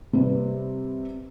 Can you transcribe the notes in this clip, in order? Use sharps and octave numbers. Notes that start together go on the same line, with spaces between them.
C3 G3 B4